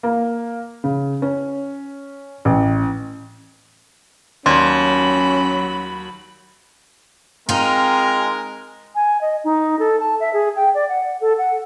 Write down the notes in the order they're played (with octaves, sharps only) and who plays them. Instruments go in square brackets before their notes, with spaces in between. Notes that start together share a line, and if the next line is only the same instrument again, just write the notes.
[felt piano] A#3
C#3
C#4
A1
[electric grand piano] D#2 [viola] F#3 B5 [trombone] C#4 [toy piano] D5 C6
[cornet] G#3 [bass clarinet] C4 [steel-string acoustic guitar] D#4 F4 [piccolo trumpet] A#4
[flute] G#5
D#5
D#4
A4
A5
E5
G#4
G5
D5
F#5
A4
F#5